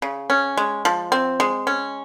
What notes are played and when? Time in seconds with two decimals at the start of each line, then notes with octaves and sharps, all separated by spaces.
0.02 C#3
0.30 C#4
0.57 G#3
0.85 F3
1.12 C4
1.40 G#3
1.67 C#4